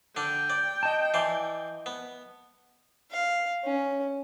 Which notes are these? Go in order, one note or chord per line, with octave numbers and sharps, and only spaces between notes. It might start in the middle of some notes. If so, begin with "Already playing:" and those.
D3 D4 G5
D5
D#5 A5
E3 D5 C6
B3
F5
C#4